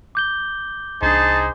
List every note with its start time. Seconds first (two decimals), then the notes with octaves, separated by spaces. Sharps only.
0.15 D6 G6 G7
1.02 C2 D4 D#4 G#4 C5 A5